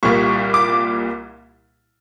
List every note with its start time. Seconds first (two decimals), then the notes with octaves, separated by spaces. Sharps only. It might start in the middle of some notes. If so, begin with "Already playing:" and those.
0.03 C2 A#2 G3 A#3 C#6
0.54 D6